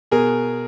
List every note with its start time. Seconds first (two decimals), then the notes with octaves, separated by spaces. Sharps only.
0.11 B2 G#4 A#4